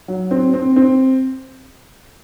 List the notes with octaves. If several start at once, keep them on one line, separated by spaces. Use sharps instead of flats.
F#3
C4
C4
C4